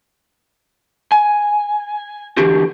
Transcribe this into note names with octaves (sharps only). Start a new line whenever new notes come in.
G#5
E2 D3 F#4 G4